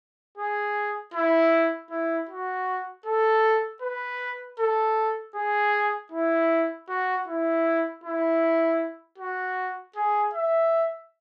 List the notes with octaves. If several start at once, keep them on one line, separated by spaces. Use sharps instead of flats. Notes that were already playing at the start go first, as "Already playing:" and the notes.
G#4
E4
E4
F#4
A4
B4
A4
G#4
E4
F#4
E4
E4
F#4
G#4
E5